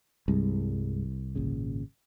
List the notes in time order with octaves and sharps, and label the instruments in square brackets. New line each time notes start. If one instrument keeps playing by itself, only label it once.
[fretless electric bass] C2 [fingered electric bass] G2 G3 G#3
[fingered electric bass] G#1 A#2 C#3